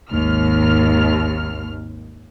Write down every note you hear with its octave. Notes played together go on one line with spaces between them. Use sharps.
G#1 D#2 F6